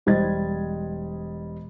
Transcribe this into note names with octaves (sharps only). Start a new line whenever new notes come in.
E1 G3 C5 D#5 G#6 A6